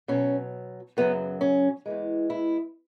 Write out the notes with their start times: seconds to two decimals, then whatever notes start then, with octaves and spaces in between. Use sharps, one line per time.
0.08 B2 F#3 C#4
0.97 F#2 C#3 F#3 B3
1.41 C#4
1.86 E2 E3 G#3
2.30 E4